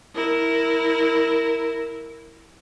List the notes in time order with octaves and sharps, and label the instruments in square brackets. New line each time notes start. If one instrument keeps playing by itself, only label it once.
[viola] E4 A#4